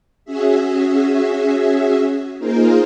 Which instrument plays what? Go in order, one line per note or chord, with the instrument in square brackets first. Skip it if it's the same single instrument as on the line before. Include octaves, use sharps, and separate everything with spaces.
[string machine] C#4 F#4 G#4 E5
A#3 D#4 F4 G#4 A#4 C5